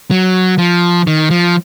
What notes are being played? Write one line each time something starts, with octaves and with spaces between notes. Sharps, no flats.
F#3
F3
D#3
F3